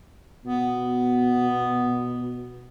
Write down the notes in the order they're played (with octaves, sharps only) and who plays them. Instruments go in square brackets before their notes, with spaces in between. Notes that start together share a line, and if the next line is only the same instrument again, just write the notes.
[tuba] B2 [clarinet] B3